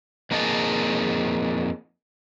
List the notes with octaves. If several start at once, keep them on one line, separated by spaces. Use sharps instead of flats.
F2 A#3 D#4 G#4 D#5 A5